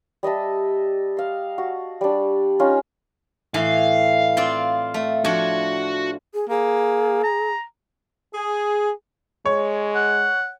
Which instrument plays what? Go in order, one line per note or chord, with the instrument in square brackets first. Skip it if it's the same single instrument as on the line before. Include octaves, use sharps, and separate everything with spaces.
[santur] G3 D#5 E5 A5
F5 C6
F#4
G3 D4
C#4 D#4 F4
[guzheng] A2 E3 [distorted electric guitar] F5
[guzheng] C4 F4 D5
A3
[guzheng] F3 D4 C#5 [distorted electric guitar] F#4
[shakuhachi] G#4
[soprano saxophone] A#3 [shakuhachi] G#4
[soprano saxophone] A#5
[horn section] G#4
[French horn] G#3 [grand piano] C#5
[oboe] F#5